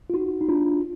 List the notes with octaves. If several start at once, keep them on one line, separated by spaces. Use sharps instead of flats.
F4
D#4 F#4
D#4
D4 F4